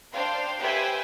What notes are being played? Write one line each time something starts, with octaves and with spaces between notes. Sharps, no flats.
D4 C5 F5 G5 C6
G4 B4 C5 E5 G5 G#5